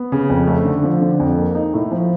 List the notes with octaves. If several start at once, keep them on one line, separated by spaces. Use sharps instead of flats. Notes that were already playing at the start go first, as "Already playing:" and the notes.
Already playing: B3
C#3
F2
A3
D3
F3
D3
F2
A#3
D#4
A2
F3